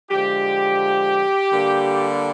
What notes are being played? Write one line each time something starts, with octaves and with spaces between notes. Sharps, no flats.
D3 F3 G#3 G4
D3 G3 A#3